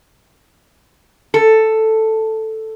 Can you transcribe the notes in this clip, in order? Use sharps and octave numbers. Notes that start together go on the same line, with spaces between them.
A4